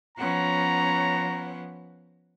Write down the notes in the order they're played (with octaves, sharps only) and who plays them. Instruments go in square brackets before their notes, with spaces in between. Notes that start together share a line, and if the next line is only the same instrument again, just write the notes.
[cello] F3 B3 [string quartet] C#4 C#5 F#5 [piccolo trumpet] A#5